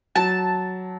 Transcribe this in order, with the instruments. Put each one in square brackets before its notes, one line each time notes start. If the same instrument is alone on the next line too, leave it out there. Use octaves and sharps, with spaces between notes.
[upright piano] F#3 [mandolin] A5